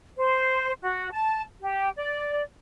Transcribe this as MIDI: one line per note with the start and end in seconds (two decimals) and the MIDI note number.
0.17 0.72 72
0.81 1.10 66
1.12 1.41 81
1.60 1.89 67
1.96 2.43 74